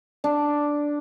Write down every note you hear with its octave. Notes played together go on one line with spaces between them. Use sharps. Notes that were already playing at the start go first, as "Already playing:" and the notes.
D4